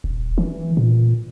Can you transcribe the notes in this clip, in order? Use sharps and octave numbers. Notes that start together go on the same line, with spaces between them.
D#1
E3
A#2